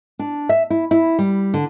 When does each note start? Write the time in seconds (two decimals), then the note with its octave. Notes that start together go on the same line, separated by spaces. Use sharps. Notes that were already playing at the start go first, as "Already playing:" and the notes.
0.19 D4
0.49 E5
0.70 E4
0.91 E4
1.19 G3
1.54 D3